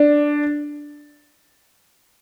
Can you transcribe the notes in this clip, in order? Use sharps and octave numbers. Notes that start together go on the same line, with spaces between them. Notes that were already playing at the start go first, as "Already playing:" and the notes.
Already playing: D4